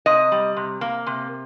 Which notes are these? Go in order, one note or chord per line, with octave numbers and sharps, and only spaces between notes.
C3 D#5
G3
C3
A#3
C3